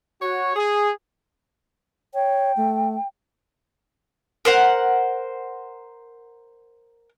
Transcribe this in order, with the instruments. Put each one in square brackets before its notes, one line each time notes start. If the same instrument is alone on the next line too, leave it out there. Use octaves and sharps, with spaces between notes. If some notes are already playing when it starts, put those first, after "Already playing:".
[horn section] F#4 C#5
G#4
[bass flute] C#5 [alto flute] G5
[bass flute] A3
[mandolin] A#4 C5 F#5